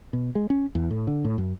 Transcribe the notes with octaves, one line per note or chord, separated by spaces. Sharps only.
B2
G#3
C#4
E2
A2
D3
A2
F#2